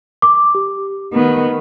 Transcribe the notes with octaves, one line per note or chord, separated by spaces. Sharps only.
D6
G4
D#3 B3